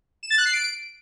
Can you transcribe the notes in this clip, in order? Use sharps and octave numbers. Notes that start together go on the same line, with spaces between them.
E7
A6
F#6
C7
D7